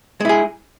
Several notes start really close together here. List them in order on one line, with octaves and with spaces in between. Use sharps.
G#3 E4 G#4